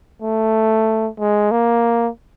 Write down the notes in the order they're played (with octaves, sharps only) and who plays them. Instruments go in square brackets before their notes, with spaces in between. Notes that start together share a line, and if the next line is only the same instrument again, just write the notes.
[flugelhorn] A3
G#3
A#3